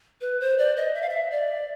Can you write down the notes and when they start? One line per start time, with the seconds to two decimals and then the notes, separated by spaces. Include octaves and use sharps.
0.21 B4
0.40 C5
0.58 D5
0.76 D#5
0.94 E5
1.02 F5
1.10 E5
1.31 D5